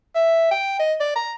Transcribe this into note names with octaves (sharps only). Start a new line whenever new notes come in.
E5
G5
D#5
D5
A#5